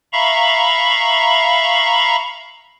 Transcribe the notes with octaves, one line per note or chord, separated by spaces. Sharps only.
E5 F5 A#5 B5 C#6